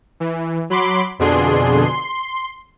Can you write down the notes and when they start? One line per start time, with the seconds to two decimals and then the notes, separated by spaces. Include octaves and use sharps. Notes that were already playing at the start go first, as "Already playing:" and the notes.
0.20 E3
0.70 F#3 B5 C6 D6
1.19 F2 B2 D3 D4 G#4 C6
1.85 C6